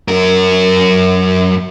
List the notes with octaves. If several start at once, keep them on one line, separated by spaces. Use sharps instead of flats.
F#2 A#4